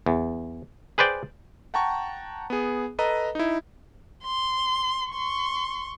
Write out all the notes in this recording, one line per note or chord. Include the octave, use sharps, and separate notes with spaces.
E2
G#4 B4 C5 D5 G5
F#5 G5 A5 A#5 C#6
B3 G#4
A4 B4 D#5 A#5
D#4 E4
C6
C6 C#6